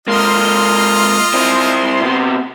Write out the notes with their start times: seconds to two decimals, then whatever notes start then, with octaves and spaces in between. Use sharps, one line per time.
0.08 G#3 A#3 F4 D#5 C6
1.34 C4 E4
2.01 C3 B3